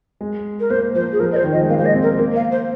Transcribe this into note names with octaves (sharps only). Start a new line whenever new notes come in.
G#3
A#4
A#3 C5
F3 C5
G#4
F3 A#4
D#5
C5
D#3
F3 D#5
G#3
A#3 F5
C5
G#3
D#5
C4
A#4
A#3
A#3
F5
C5